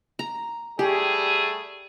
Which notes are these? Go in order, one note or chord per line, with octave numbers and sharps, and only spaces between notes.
A#5
G3 A3 G4 G#4